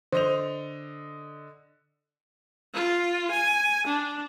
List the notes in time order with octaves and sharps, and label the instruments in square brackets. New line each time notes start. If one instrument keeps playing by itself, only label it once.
[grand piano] D3 D#5 F7 [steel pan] C5
[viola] F4
G#5
D4